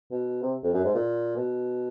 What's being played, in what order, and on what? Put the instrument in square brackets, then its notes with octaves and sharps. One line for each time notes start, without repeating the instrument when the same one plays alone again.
[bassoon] B2
C3
F2
F#2
G#2
A#2
B2